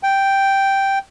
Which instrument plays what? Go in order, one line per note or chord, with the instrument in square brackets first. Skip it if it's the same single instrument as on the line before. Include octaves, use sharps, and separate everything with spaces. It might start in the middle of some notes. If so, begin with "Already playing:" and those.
[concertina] G5